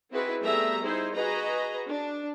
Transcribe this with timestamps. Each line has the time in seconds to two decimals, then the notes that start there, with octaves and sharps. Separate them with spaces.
0.11 C4 D#4 E4 F#4 G#4 B4
0.43 G3 A3 B3 G#4 E5 A#5
0.83 D#4 E4 G#4 C5
1.14 F#4 G#4 B4 D#5 A#5
1.89 D4